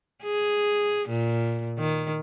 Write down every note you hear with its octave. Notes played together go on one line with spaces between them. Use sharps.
G#4
A#2
D#3